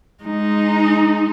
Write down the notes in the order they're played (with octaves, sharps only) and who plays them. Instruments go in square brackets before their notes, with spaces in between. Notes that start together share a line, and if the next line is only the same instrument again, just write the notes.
[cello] G#3 D#4